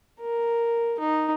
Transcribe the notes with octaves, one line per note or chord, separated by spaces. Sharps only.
A#4
D#4